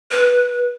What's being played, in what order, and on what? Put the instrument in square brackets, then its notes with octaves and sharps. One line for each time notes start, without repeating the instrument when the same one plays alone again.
[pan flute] B4